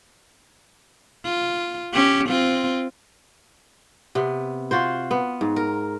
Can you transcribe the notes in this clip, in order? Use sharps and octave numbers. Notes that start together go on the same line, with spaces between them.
F4
C#4 G4
C4 F4
C3 B3
F4 F#4 C5
B3
G#2
A#4